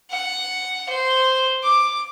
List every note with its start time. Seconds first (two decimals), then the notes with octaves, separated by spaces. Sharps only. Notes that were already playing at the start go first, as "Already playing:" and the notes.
0.11 F#5
0.89 C5
1.63 D6